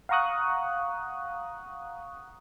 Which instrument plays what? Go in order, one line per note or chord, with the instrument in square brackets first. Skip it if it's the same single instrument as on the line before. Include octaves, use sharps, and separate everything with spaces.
[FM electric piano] F5 F#5 A#5 C#6 D#6 F#6